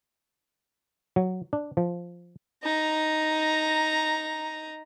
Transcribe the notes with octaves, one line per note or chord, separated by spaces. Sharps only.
F#3
D4
F3
D#4 A#5